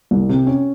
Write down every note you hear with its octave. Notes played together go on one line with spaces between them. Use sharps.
C2
C3
C#4